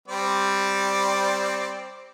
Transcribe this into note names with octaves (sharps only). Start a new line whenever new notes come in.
G3 C4 D5